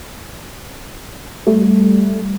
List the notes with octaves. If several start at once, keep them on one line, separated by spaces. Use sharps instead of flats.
G3 A3